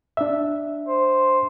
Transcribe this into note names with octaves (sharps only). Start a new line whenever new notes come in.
D4 E5
C5